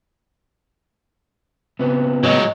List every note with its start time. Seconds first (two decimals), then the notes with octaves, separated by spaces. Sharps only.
1.79 C#3 B3 C4
2.24 A2 F#3 G#3 D#5